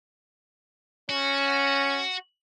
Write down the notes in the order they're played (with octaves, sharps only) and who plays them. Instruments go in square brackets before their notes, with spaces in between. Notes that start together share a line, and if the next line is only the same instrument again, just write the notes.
[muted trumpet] C#4 [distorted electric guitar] F#4